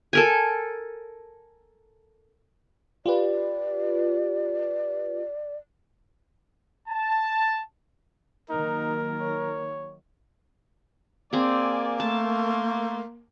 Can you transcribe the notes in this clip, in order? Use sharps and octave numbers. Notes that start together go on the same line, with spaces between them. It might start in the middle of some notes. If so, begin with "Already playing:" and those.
A4 A#4 G#5
F4 G4 B4 D5
A5
D#3 F#3 A#3 D#4 A#4
C#5
A#3 C4 G#4 D5 G#5
A3 A#4 A5 C6